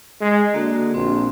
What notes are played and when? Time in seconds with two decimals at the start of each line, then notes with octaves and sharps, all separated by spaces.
0.21 G#3
0.54 D3 A#3 F#4
0.94 A#1 C4